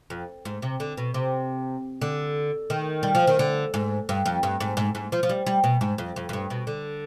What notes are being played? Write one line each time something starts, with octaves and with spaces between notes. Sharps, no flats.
F2
G#2
C3
D3
B2
C3
D3
D#3
G3
F3
D#3
D3
G#2
G2
F2
G2
G#2
G#2
G#2
F3
F3
G3
G3
B2
G#2
F2
F2
F2
G2
B2
D3